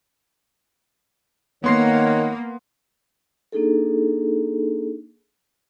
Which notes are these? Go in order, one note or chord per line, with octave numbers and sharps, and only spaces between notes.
D#3 A#3 B3 C#5 F#5 C6 C7
A#3 D4 D#4 G#4 A4